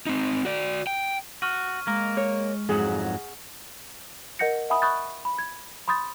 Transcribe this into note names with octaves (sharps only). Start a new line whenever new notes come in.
C4 D#4
F#4 D5
G5
F#4 C#6 F6 D#7
G#3 A#3 A#4
C#5
F2 G#2 F#3 G#4 F#5
A#4 D#5 F#5 G6 A#6 C#7
E5 F#5 G#5 B5 D#6
B5 C#6 D#6 F#6 G6 A6
B5
G#6
B5 C6 D#6 G6 A6